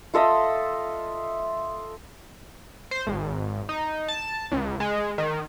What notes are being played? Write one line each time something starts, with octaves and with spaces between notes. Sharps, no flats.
F4 A4 D#5 E5
C5
G#1
D#4
A5
C#2
G#3
D#3